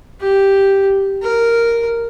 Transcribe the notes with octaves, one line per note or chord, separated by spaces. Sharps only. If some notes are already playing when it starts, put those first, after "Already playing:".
G4
A#4